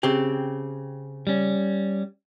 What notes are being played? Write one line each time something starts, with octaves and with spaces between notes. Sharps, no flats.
C#3 C4 G4
G3 C#4